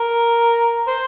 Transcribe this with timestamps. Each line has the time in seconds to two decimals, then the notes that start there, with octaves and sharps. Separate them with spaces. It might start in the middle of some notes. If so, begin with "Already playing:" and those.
Already playing: A#4
0.87 C5